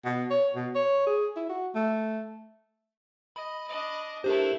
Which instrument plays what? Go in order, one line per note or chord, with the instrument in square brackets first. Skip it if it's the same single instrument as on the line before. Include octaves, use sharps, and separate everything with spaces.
[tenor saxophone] B2
C#5
B2
C#5
G#4
E4
F#4
A3
[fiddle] D#5 [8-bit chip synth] B5
[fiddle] D4 D#5
[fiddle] A3 E4 [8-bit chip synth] D4 C5 [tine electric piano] G4 A#4